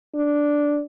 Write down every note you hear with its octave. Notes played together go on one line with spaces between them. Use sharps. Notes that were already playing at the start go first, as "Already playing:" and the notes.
D4